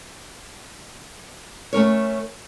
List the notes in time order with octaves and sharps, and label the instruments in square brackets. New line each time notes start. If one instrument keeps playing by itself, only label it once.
[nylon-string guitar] A3 C#4 A#4 C#5